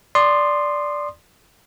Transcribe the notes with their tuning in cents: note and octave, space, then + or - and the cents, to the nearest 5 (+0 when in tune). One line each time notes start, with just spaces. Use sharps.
D5 +0 C6 +0 D#6 -30